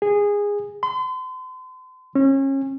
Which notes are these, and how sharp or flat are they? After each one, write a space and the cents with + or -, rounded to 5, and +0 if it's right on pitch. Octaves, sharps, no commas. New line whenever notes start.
G#4 -15
C6 -40
C#4 -30